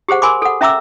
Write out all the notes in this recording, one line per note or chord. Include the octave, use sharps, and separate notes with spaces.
G4 G#4 C5 F#5
A#4 G#5 B5 C6 D6
A4 F#5
C#4 E5 A#5 D6 E6